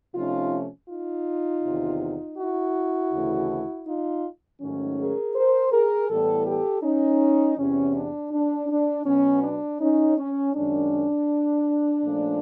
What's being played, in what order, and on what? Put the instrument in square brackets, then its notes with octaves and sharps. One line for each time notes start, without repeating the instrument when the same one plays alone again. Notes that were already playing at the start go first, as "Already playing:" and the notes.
[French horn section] C3 F3 A3 C#4 D#4 F4
D#4 F4
E2 C3 D#3
E4 F#4
D2 C#3 E3 A3
D#4 F4
G#2 D#3 F#3 A3 C#4
G#4 A#4
A#4 C5
G#4 A#4
A2 E3 G3 B3 G4 A4
G4 A4
C#4 D#4
E2 C3 E3 C#4
D4
D4
D4
B2 F#3 B3 C#4
D4
C#4 D#4
C#4
F#2 D#3 G#3 C#4 D4
A#2 F3 A3 C#4